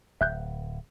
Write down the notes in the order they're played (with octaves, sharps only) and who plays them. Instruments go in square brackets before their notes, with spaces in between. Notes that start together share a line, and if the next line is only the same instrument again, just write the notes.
[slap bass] D1 [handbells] E5 F#6 G6